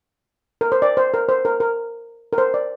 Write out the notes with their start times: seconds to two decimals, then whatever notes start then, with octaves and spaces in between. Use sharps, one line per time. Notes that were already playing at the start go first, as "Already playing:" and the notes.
0.61 A#4
0.72 C5
0.82 D5
0.97 C5
1.14 A#4
1.29 C5
1.45 A#4
1.60 A#4
2.33 A#4
2.38 C5
2.54 D5